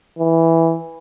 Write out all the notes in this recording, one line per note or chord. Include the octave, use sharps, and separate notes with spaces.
E3